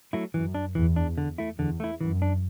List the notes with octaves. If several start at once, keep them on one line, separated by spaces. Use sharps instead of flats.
F#3 A3 E4
F#2 E3
D4
E2 E3
D4
D3
A3 E4
E2 D3
A3 E4
F#2 E3
D4